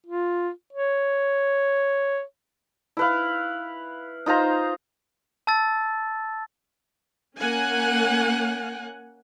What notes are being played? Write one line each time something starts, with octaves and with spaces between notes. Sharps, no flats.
F4
C#5
E4 B4 F5
D#4 F4 C5 A#5
A5 E6 A6
A#3 C#4 F#5 G#5